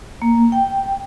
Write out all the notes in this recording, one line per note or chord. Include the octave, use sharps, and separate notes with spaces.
A#3
G5